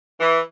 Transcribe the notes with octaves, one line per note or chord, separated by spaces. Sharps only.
E3